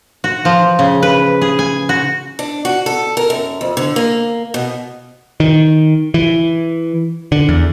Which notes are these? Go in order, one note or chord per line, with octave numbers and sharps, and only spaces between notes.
F#4
F3
C#3
B4
G#4
G#5
F#4
D4
F#4
A4
A#4
F#2
F2
D3
A#3
B2
D#3
E3
D3
E2